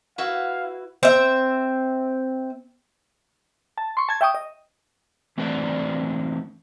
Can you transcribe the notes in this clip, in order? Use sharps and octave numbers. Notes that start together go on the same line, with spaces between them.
E4 F#4 B4 F5
C4 E5
A5
C6 C#6
A5 G#6
E5 G5 C#6 D#6
D#5
E3 A3 C4 D4 B4 D5